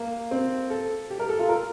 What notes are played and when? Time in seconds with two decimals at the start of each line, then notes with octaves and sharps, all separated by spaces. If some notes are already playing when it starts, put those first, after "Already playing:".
Already playing: A#3
0.31 C4
0.70 A4
1.10 G4
1.20 A#4
1.29 A4
1.39 F4
1.49 A#4